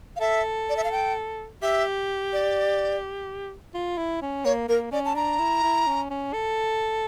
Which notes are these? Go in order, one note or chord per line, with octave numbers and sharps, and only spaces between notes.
F5
A4 E5
D5
E5
F5
G5
G4 E5
D5
F4
E4
C#4
A#3 C#5
A#3 A#4
C#4 D5
A5
D4 A#5
E4
E4
C#4
C#4
A4